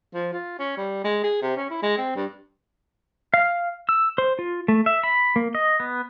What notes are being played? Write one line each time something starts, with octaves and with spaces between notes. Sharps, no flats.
F3
F4
C#4
G3
G#3
G#4
C3
C#4
E4
G#3
C4
G2
F5
E6
C5
F4
A3
E5
B5
A#3
D#5
B3